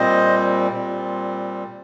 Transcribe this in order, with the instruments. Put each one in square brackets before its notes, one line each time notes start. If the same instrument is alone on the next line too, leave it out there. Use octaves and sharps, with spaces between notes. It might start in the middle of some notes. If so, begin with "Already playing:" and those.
Already playing: [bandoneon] A#2 G3 C4 C5 D#5
A#2 G3 C4